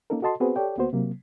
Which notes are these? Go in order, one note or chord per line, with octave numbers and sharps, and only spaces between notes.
A#3 C#4 D#4 A4 A#4
F#4 A4 D#5 A5 C6
B3 C4 F#4 G#4 B4 C5
G4 A4 C#5 D5 G5
D2 A#3 B3 F#4 C5
C3 F#3 A#3